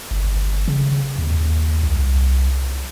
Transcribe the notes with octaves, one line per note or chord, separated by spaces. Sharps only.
G1
C#3
D#2
C2